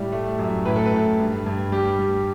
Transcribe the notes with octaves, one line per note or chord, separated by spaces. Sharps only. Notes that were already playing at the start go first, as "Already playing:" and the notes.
Already playing: A2 G3 D5
A3
F#2
A2 B4
A4
B4
A2
G2
G2
G3 G4
G3